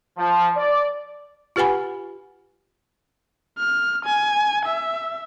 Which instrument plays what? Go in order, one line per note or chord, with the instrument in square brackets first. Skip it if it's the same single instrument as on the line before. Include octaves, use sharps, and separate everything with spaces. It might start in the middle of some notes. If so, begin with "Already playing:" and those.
[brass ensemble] F3
D5
[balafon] F4 G4 B4 F#5 G#5 B5
[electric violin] F6
G#5
E5